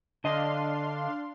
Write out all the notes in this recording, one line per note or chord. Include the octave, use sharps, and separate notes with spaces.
D3 D4 D#5 F5 C6